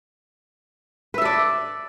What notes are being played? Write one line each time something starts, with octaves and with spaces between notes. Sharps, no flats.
A4 B4 D5 E5